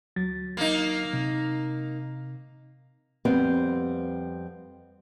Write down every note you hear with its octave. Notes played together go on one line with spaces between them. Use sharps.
D2 F#3 A6
A#3 D#4
C3
F2 G3 B3 C4 B4 F5